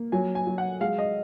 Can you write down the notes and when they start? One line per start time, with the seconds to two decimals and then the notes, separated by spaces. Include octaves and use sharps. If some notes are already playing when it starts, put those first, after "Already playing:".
Already playing: A#3
0.12 F#3 G#5
0.35 G#5
0.47 F#3
0.58 F#5
0.81 G#3 F5
0.98 D#5